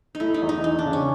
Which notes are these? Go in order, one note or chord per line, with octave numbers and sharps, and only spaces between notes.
D#4
A3 E4
D#4
E2
D#4
E3 D#4
D4
C#3
C#4